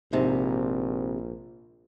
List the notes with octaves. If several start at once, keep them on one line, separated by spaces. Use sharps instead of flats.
A#1 G#2 C3 D#4